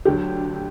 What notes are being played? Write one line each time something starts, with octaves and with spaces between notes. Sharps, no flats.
D2 D3 F#3 G4